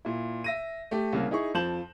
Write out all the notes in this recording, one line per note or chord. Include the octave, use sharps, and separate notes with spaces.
A#2 E4
E5 A#6 D#7
A3 G4
C2 C#3 A#3
D#4 E4 G#4 C#6
F2 F3 A5 G6 E7 F#7